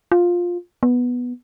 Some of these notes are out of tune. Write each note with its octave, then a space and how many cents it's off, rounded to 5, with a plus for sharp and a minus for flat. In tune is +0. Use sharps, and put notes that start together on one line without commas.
F4 +10
B3 -5